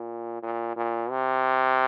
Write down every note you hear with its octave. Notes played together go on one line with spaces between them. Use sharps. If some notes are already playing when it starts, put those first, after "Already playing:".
Already playing: A#2
A#2
A#2
C3